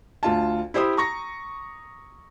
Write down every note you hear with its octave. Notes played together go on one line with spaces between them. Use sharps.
D2 F4 A5
E4 G4 C5 B5 D#6
A#5 C#6 A#6